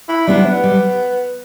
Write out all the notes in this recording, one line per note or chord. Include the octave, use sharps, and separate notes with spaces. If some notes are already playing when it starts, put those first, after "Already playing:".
E4
G3 B3 D4 E4
B3
G3